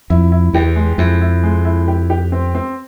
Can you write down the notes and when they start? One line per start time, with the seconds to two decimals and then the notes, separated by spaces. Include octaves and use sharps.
0.10 F2 E4
0.32 E4
0.54 E2 G4
0.76 G#3
0.98 F2 E4
1.21 E4
1.43 G#3
1.65 E4
1.88 G4
2.10 G4
2.32 C4
2.55 C4